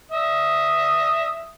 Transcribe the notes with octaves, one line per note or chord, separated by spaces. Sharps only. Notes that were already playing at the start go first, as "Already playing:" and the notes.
E5 D#6